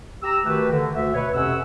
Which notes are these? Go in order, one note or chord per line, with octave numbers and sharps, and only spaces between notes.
G4 A#5 E6
D#3 A3 F#4 G4 B4
D3
D2 E5
B2 B4 C#5
F2 C3 C#4 F#5 E6